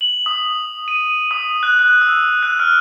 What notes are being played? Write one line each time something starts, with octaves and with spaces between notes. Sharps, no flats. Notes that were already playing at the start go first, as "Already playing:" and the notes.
F#7
D#6
D#7
D#6
F#6
F#6
E6
F#6
F6